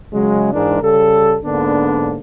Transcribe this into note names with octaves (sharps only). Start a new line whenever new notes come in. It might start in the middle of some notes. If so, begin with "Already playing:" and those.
C#3 F#3 G#3
G#2 E3 G#3 D4 A#4
C#3 G3 A4
G#2 D3 A#3 B3 D4